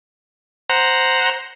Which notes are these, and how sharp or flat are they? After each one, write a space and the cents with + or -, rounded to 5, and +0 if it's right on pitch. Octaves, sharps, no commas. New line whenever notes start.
C5 +0 F#5 +0 A#5 +0